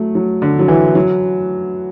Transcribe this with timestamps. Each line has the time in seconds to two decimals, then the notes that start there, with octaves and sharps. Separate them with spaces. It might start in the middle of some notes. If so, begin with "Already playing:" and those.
Already playing: F#3 A3
0.15 F#3
0.42 D3
0.59 F#3
0.68 E3
0.95 F#3